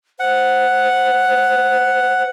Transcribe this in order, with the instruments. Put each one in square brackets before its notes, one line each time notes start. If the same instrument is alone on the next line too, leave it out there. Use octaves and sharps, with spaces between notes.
[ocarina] C5 [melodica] F#5